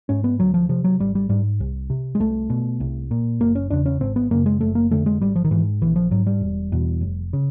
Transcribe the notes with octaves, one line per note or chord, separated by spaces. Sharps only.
G#2 C#4
B3
D2 F#3
F3
C3 F3
F#3
G#1 G3
G3
G#2 G3
C2
C3
G#3
C2 A3
B2
C2
A#2
F#1 A#3
C#4
E2 C#3 D4
C#4
G#1 C4
B3
F#2 C#3 A#3
G#3
F#1 A3
A#3
F2 D3 A3
G#3
G#1 G3
F3
D#3
G#2 E3
A#1 E3
F3
G#2 F#3
G3
E1
E2 B2
F1
C#3